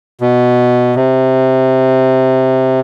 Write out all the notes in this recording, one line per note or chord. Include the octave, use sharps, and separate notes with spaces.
B2
C3